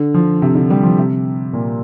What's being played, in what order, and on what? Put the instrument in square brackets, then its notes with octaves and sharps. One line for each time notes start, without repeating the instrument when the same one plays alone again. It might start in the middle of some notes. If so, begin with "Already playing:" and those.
Already playing: [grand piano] D3
F3
C3
D3
G3
F3
C3
A#2